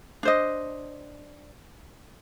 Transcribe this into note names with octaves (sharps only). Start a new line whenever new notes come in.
D4 C5 D#5